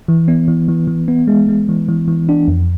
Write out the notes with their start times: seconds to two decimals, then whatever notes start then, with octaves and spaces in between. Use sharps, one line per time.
0.08 E3
0.28 B3
0.48 E3
0.68 E3
0.87 E3
1.08 B3
1.27 G#3
1.49 G#3
1.69 E3
1.88 E3
2.08 E3
2.29 D4
2.48 F2